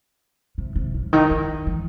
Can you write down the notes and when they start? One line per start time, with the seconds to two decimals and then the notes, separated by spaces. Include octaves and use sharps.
0.58 C3
0.76 C3
0.94 C#3
1.13 D#3
1.31 D#3
1.67 E3